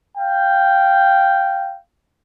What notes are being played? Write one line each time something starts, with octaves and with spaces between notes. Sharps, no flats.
F5 G5